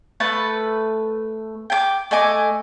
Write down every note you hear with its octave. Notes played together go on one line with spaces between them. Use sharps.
A3 B4 A5
G5 G#5 D6
A3 D#5 G#5 D6